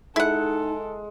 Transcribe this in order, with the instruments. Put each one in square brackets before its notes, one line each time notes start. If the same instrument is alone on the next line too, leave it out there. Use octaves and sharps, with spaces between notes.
[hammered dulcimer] G#3 [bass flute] D#4 [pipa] E4 F#5 [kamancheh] A4